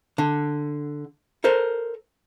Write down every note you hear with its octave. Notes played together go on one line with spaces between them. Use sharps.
D3
A4 A#4 C5